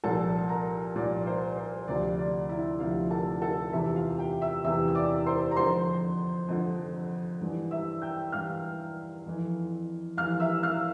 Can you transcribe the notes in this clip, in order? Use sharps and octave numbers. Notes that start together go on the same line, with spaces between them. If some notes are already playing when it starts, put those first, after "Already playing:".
C2 A#2 F3 A4 A5
A#4 A#5
C2 A#2 F3 D5
C5
C5
D2 C3 F3 D5
D5
E4 E5
D2 C3 F3 F4 F5
A4 A5
A4 A5
E2 C3 E3 E4 E5
F4 F5
G4 G5
E5 E6
E2 C3 E3 E5 E6
E6
D5 D6
C5 C6
A#5
F2 D3 F3 C5 C6
F2 D3 F3
G2 E3
E5 E6
G5 G6
G2 E3 F5 F6
F2 E3
F2 E3 F5 F6
E5 E6
F5 F6